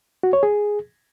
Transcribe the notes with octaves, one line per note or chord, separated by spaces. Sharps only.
F#4
C#5
G#4